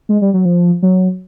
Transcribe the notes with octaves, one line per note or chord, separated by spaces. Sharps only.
G#3
G3
F#3
F3
F#3